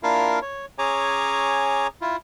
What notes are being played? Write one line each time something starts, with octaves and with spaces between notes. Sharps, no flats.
A#3 D4 E4 F4 A#4 F5
C#5
C#4 G#4 C#5 G#5 A#5 D6
E4 F4